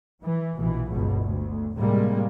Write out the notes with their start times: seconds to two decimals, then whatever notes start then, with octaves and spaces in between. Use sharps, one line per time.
0.22 E3
0.59 A#1 B2 E3
0.90 G1 C#2 B2
1.22 D2
1.76 A2 C3 G3 G#3 A#3